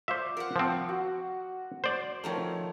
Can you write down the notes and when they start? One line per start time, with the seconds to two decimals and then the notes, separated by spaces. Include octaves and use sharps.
0.08 F4 C5 D5 E5 C#6
0.37 A#4 F#5
0.56 F3 C4
0.89 F#4
1.84 C5 D5
2.24 D#3 F3 A3 C#5 A5 A#5